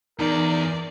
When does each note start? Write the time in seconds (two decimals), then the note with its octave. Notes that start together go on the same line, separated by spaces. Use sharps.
0.19 E2 D#4 A#4 D5